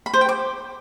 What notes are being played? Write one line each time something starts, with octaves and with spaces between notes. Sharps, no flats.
B5
C5
G5
D6